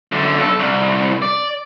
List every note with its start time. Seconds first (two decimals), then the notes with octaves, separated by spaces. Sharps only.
0.12 F#2 D3
0.37 B1 A4
0.59 C2
1.22 D5